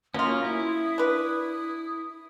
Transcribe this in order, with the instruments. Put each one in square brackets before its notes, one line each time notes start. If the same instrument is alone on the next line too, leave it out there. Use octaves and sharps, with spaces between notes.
[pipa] F#3 F4 [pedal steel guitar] A#3 C#4 [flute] D#6
[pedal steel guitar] E4
[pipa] D4 B4